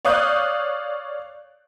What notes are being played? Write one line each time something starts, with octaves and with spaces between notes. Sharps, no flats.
C#5 D5 F5 D#6 F#6 G6